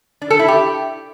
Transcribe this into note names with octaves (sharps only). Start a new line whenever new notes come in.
D4
A4
E4
G4